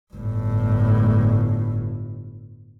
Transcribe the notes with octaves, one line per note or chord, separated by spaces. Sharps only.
G1 A2